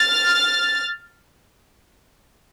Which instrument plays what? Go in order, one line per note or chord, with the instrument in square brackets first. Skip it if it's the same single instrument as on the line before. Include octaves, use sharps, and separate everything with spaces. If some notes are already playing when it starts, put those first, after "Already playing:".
Already playing: [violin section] F6 A6